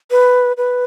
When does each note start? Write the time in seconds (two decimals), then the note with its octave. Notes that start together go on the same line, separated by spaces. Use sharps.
0.11 B4
0.57 B4